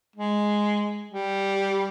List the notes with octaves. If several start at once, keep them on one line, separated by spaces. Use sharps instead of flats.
G#3
G3